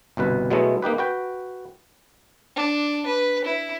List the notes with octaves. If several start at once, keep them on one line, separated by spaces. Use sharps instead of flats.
G1 C2 B2 B4
B2 F#3 G#3 A3 B3 E4
A#3 D#4 G4 B4
F#4 B4 G5
D4
B4
E4